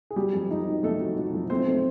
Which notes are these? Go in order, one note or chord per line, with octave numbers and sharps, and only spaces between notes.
G#4
F#3 G3 G4
F2
F2 D#4
F#3
F2 A3 A4
F#3
F#3
F2
A3 C4 C5
A3